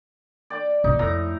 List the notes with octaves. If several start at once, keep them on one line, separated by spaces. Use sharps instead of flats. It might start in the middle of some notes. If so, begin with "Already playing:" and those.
D5 G5 D6
B2 D#3 D#4
F2 A2 A#5